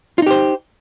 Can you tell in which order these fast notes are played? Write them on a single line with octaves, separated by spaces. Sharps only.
F4 D#4 G4 C5